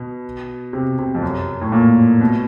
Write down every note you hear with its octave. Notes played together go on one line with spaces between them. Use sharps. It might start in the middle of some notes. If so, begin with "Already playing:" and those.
Already playing: B2
C3
C3
F2
F#2
A2
A#2
B2